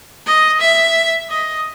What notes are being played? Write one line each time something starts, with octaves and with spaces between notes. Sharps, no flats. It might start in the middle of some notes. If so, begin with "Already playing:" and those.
D#5
E5
D#5